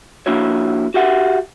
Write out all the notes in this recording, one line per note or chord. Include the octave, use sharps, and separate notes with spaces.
F3 A#3 D4 E4 F#4 C#5
F#4 G4 E5 F#5